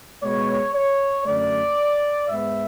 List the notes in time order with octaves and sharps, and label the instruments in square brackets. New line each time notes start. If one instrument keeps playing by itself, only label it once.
[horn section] B2 G#3 B3 C#5
C#5
F#2 D3 A3 D5
G#2 G#3 B3 E5